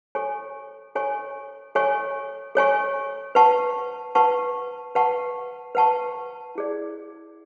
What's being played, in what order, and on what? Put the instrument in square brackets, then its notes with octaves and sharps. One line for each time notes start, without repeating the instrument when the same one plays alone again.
[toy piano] A4 C#5 G#5 C#6
A4 C#5 G#5 C#6
A4 C#5 G#5 C#6
A4 C#5 G#5 C#6
B4 F#5 A5 C#6
B4 F#5 A5 C#6
B4 F#5 A5 C#6
B4 F#5 A5 C#6
E4 G#4 D5